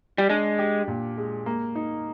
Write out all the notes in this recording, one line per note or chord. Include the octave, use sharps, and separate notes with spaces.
G3
G#3 D4
G4
A#2
G#3
A#3
D#4